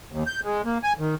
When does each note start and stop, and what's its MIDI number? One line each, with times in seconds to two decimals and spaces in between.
0.12 0.23 39
0.27 0.40 91
0.44 0.62 56
0.65 0.78 58
0.83 0.93 80
0.99 1.15 51